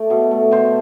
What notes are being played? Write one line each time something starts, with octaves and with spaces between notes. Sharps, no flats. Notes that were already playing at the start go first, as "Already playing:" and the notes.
Already playing: A3 D5
B2
A3
B2 C5